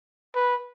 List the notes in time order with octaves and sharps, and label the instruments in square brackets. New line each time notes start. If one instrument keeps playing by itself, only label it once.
[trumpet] B4